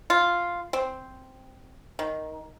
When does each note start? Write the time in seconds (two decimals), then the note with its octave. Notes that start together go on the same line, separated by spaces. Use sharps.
0.10 F4
0.73 C4
1.99 D#3